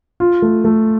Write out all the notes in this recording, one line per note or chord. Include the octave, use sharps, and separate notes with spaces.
F4
A3
A3